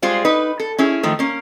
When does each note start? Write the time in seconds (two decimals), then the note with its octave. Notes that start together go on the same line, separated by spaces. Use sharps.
0.02 G3 G#3 F4 G#4 C5
0.25 D#4 B4
0.60 A4
0.78 C#4 E4 G#4
1.03 D#3 F3 A3
1.19 A#3 C#4